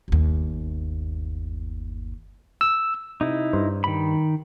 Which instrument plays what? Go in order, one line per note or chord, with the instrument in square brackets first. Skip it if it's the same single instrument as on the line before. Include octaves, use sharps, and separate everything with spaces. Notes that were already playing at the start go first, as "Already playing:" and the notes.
[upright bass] G1 D#2
[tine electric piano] E6
[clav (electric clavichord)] C3 [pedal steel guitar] D#4 E4
[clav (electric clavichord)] G2 C5 A#5
[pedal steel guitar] D#3 B5